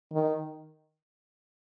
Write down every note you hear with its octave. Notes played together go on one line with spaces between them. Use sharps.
D#3